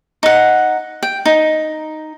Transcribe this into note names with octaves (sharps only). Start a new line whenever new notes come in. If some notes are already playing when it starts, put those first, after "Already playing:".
D#4 F#5
G5
D#4